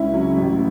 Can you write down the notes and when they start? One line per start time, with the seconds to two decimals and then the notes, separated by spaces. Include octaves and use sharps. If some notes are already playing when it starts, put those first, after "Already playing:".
Already playing: C#2 C#4 E4
0.13 C#3 F#3
0.37 A1